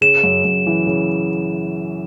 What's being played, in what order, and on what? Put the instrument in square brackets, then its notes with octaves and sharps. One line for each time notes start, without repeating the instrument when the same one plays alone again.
[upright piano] C#3 [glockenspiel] E7
[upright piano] F#2
F#2
E3
C#3